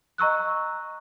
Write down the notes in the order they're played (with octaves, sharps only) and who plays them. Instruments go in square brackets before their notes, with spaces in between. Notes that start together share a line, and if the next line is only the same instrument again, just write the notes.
[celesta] D#5 A#5 C#6 E6 F#6